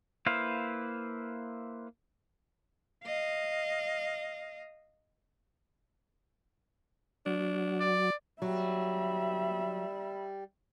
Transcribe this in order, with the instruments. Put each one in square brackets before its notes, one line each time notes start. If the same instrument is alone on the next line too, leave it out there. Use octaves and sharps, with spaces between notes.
[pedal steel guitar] A#3 E4 B4 C5 F5
[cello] D#5 F5
[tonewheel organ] F#3 [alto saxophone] D4
[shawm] D5
[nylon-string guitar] F#3 [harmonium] G3 [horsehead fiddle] E5 B5